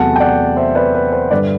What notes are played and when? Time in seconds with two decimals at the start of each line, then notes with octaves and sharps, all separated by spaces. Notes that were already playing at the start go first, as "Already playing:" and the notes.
Already playing: E2 C3 F#3 A3 F#5 A5
0.16 G5
0.20 D5 F#5
0.57 C5 E5
0.75 B4 D5
0.94 B4
1.12 C5
1.31 G2 D3 G3 B4 D5